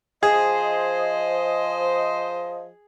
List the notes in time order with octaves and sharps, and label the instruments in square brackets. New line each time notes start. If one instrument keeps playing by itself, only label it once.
[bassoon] F3 [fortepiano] G#4 [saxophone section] C5 D#5